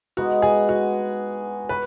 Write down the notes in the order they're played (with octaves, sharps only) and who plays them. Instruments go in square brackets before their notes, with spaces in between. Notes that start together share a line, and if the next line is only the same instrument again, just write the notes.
[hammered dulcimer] G#3 B3 D#4 [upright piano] F#4
[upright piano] G#4
F#4
[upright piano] B4 [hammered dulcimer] C#5